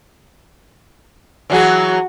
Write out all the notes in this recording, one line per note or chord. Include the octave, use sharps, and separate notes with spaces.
E3 F#3 F#4 G#4